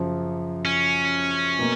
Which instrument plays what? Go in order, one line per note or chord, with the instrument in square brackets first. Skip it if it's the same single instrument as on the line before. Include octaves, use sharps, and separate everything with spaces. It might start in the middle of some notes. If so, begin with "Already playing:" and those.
Already playing: [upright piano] F#2 C#3 F3
[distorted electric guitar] C#4
[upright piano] B2 A#3